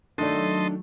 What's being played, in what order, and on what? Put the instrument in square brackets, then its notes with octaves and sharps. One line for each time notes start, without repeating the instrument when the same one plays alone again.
[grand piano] D#3 A3 D5 [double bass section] F#3 [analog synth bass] D4 [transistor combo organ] A4 D#5 C6